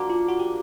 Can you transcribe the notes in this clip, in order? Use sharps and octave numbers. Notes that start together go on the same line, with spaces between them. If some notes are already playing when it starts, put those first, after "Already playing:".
Already playing: F3 A#3 D4 F#4
F4
F#4
G4